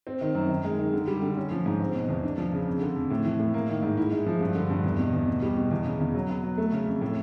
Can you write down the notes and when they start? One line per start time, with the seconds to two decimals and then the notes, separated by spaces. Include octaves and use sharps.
0.07 C4
0.21 D#3
0.35 F#2
0.50 D#3
0.64 G#3
0.79 D#3
0.93 D3
1.08 G3
1.22 D3
1.37 C#4
1.51 F3
1.66 G#2
1.80 C4
1.95 B2
2.09 E2
2.23 D4
2.38 F3
2.53 C#3
2.67 F2
2.81 D3
2.96 F2
3.10 A2
3.25 E3
3.39 A2
3.54 A#3
3.68 D#3
3.83 G#2
3.97 E4
4.12 G#3
4.26 F3
4.41 G2
4.55 D3
4.70 G2
4.84 E2
4.99 B2
5.13 E2
5.27 B2
5.42 G3
5.57 B2
5.71 E2
5.85 C#3
6.00 E2
6.15 F#3
6.29 B3
6.43 F#3
6.58 A3
6.72 C#3
6.87 F2
7.01 A2